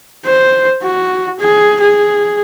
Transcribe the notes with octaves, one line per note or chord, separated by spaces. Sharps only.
C5
F#4
G#4
G#4